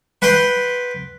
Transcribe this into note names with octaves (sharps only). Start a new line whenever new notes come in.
B4 F#5 G5 C6